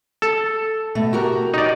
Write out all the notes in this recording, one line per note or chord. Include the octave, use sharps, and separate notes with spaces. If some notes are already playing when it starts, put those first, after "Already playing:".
A4
B2 A3
F#4 G4 A#4
D#4 D5